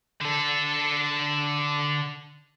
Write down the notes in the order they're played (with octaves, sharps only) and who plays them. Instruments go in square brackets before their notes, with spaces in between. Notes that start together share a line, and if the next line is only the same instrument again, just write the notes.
[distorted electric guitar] D3 A4